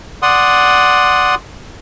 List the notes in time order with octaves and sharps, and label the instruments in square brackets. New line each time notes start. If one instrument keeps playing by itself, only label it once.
[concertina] D5 F#5 C6 D#6